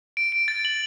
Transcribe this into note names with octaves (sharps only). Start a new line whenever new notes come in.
D7
D7
A6
F#7